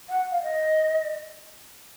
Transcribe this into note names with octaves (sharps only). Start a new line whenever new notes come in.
F#5
F5
D#5